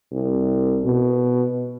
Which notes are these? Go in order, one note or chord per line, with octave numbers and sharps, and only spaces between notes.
C2
B2